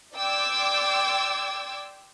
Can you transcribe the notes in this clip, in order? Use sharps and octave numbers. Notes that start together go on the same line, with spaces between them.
D5 G5 C6 D6 E6 G#6